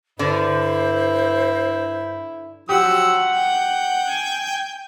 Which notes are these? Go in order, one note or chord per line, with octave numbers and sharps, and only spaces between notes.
G2 D3 E4 C5
F3 F#3 G4 F#5 E6
G5
G#5